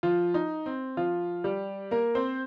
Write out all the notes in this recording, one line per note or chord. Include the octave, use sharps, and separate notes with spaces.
F3 F4
D#4
C4
F3 F4
G3 G4
A#3 A#4
C4 C5